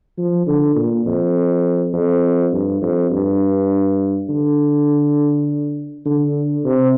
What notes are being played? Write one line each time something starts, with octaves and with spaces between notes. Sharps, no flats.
F3
D3
A#2
F2
F2
G2
F2
G2
D3
D3
C3